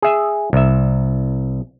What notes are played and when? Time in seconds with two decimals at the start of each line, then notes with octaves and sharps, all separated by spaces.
0.02 G#4 E5
0.53 C2 E5